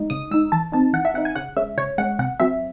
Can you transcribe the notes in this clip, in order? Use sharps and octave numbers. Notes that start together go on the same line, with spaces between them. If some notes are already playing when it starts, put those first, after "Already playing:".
Already playing: G#3 D#4
C#3 D#6
G#3 D#4 E6
E3 A5
C4 D#4 A5
E3 F#5
E5
C4 D#4 F#5
G#5
C#3 F#5
G#3 C#4 E5
C#3 C#5
G#3 C#4 F#5
C3 F#5
F#3 C4 E5